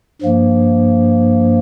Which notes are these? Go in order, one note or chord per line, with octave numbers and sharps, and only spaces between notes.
G2 F3 A#3